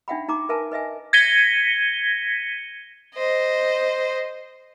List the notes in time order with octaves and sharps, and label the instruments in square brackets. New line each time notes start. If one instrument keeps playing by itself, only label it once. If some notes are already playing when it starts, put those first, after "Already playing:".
[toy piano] D4 D#4 E5 F#5 G5 B5
D#4 A#5 D6
A#4 B4 E5 G#5 A5
B4 D#5 E5 G#5
[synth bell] G#6 A#6 B6 C#7 D#7 G7
[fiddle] C5 D#5